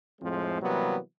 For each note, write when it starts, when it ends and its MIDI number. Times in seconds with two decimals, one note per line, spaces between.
0.22 0.61 41
0.22 0.61 45
0.22 0.61 53
0.22 0.61 56
0.22 0.61 60
0.62 0.98 48
0.62 0.98 52
0.62 0.98 54
0.62 0.98 55
0.62 0.98 58
0.62 0.98 59